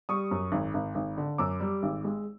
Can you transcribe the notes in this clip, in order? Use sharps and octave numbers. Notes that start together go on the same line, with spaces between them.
G3 C#6 D#6
F#2
G#1
G#1
G#1
D3
F#2 D6 E6
G3
G#1
G#3